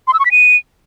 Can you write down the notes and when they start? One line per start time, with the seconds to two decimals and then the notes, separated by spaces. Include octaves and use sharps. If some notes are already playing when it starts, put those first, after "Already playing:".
0.08 C6
0.14 E6
0.19 C#6
0.25 B6
0.31 D#7